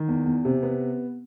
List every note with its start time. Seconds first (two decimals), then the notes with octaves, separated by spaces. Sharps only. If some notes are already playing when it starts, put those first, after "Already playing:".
Already playing: D#3
0.08 E2
0.26 E2
0.45 C3
0.63 B3